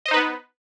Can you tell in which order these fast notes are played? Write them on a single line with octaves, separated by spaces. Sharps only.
D#5 C5 D#4 B4 B3